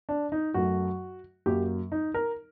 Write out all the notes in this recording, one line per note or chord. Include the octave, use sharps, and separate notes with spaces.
D4
D#4
F#2 F#3 A3 F#4
F#2 F#3 A#3 G4
D#4
A#4